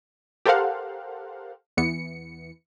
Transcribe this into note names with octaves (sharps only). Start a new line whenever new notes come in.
G4 A4 A#4 C5 F5 F#5
E2 E3 B3 C#7